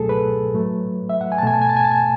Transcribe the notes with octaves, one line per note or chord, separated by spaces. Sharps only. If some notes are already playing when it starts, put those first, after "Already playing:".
Already playing: C#2 B2 F#3 A3 G#4 A4
B4
A2 F#3 A3
E5
F#5
G#5
A5
B2 A3 G#5
A5
G#5
A5
G#5
A5
G#5